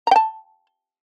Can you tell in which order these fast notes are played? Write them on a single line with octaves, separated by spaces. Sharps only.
A#5 G5 A5